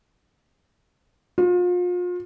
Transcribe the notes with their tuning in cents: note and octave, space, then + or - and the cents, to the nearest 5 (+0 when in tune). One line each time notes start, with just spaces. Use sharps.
F4 +35